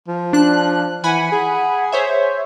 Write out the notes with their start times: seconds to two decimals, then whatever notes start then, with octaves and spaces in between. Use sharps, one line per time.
0.08 F3
0.33 D4 F#6
1.04 E3 F#5 G#5 B5
1.32 G#4
1.92 C5 C#5 E5